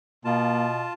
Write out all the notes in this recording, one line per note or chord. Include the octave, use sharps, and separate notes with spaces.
B2 A#3 F4 A5